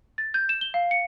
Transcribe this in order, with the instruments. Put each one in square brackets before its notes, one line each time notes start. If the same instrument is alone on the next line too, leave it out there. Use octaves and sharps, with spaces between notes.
[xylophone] A6
G6
E7
G7
F5
C#7